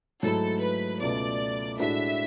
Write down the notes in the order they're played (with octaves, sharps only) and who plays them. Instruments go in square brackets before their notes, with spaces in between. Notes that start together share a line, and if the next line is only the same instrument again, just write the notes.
[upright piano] G#2 F#3 A3 E4 [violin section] A4
[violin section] B4
[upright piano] C#2 B2 A3 [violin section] D5
[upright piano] A2 G#3 D4 F#4 A4 [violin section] E5